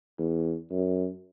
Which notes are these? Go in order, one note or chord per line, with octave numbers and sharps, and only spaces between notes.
E2
F#2